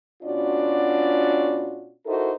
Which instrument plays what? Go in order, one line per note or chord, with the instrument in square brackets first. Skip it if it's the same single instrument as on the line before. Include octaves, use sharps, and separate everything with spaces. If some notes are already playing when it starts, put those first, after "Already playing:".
[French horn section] B2 C#4 D4 F4 F#4 D5
D#4 E4 F#4 A4 A#4 C5